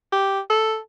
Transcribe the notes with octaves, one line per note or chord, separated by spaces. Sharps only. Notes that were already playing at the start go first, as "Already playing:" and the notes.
G4
A4